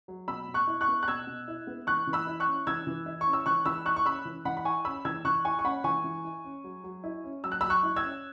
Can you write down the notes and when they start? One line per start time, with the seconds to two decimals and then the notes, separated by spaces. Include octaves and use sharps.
0.08 F#3
0.28 B2 B5 E6
0.48 B2
0.54 C#6 F#6
0.67 E4
0.81 C#6 F#6
0.88 B3
1.03 F#6
1.08 B2 E6 G#6
1.27 B2
1.48 E4
1.67 B3
1.87 E3 C#6 F#6
2.07 E3
2.13 B5 E6
2.27 E4
2.40 C#6 F#6
2.46 C#4
2.67 E3 E6 G#6
2.87 E3
3.06 E4
3.21 C#6
3.26 C#4
3.33 E6
3.46 E3 C#6 F#6
3.66 E3 B5 E6
3.86 E4 C#6 F#6
3.96 C#6
4.06 C#4 B5 E6
4.25 E3
4.45 E3 F#5 B5
4.57 B5
4.65 E4 G#5 C#6
4.85 C#4 B5 E6
5.05 E3 E6 G#6
5.25 E3 C#6 F#6
5.45 E4 G#5 C#6
5.59 C#6
5.64 C#4 F#5 B5
5.84 E3 G#5 C#6
6.04 E3
6.24 E4
6.44 C#4
6.64 F#3
6.84 F#3
7.04 E4
7.24 C#4
7.44 F#3 E6
7.52 F#6
7.61 F#3 B5 E6
7.70 C#6 F#6
7.83 E4
7.96 E6 G#6
8.03 C#4